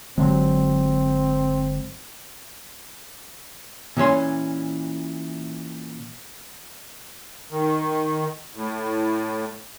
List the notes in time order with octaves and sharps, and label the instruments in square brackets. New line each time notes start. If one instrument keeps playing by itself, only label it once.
[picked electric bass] G1 D3 G#3 [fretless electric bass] F#3 [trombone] C4
[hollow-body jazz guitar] A#2 E3 C#4 C6
[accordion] D#3
A2